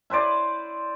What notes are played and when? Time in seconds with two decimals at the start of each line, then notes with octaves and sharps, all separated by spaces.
0.10 E4 B4 C5 D5